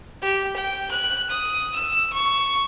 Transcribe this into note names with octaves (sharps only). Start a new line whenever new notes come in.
G4
G5
F#6
D#6
E6
C#6